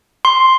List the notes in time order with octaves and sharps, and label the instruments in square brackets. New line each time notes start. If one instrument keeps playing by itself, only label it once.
[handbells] C6